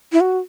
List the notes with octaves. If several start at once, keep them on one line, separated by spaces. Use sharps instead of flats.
E4
F#4